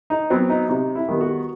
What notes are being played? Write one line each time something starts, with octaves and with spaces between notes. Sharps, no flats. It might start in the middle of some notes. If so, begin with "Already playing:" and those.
D#4
F#3 B3 C4
D#4
C3 D#4
E4
D#3 G3 B3
F#4